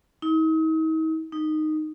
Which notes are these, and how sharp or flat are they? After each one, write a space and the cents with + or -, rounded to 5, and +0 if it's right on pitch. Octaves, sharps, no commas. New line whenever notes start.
D#4 +40
D#4 -10